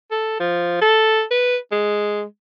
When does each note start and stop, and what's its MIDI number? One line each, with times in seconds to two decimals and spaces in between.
0.11 0.36 69
0.40 0.80 53
0.81 1.23 69
1.31 1.57 71
1.72 2.24 56